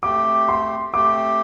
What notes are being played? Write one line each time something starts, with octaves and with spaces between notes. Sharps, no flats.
A3 C4 G4 D6
C6
A3 C4 G4 D6